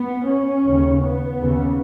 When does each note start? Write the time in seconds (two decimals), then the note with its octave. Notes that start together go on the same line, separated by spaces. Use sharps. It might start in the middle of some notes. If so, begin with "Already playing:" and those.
Already playing: B3
0.26 C#4
0.64 D#2 C#3
1.01 B3
1.37 D#2 C#3